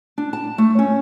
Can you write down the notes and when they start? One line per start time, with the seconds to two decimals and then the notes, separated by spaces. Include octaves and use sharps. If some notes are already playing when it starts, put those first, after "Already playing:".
0.18 D4
0.33 A5
0.58 A3
0.79 C#4